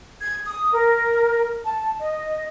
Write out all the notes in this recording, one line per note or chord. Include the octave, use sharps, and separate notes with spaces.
G#6
D#6
A#4
A5
D#5